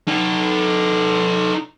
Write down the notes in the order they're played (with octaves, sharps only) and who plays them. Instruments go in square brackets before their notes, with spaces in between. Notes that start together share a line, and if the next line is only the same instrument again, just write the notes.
[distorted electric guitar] D#4 A4